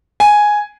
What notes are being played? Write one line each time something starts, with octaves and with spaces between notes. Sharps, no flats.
G#5